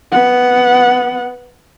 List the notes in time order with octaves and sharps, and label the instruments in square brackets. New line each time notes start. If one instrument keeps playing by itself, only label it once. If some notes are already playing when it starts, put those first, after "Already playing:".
[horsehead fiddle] B3 F#5